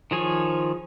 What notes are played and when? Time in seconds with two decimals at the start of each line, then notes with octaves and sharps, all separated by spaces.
0.11 D#3 F3 G#4 C#5